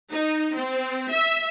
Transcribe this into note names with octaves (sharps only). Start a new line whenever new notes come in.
D#4
C4
E5